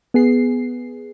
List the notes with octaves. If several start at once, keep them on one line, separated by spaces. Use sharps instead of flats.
B3 G#4 C7